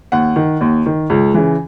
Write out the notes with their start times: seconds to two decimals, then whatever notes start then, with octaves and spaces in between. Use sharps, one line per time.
0.12 D#2 F#5
0.36 D#3
0.61 D#2
0.86 D#3
1.10 C#2
1.34 C#3 E3